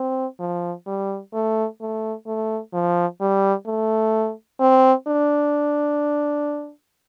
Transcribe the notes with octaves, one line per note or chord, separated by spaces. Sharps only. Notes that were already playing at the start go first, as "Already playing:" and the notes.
Already playing: C4
F3
G3
A3
A3
A3
F3
G3
A3
C4
D4